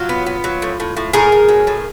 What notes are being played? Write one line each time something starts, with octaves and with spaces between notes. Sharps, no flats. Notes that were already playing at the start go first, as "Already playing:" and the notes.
Already playing: F#3 F4
B3
B3
F#3
A2
A2
A2
A2 G#4 A#4
A2
F#3
A2